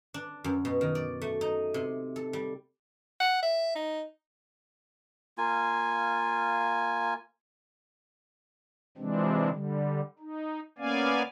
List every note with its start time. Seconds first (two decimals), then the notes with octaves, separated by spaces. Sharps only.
0.14 D4
0.44 F#2
0.65 B2
0.81 D#3
0.95 D5
1.22 A3
1.41 D#4
1.74 C3
2.16 A4
2.33 G3
3.20 F#5
3.43 E5
3.75 D#4
5.38 A#3 F4 G#5
8.98 C3 E3 F3 G#3 C4 D4
9.50 D3 G3
10.19 D#4
10.78 A#3 B3 C#4 D5 F5 G#5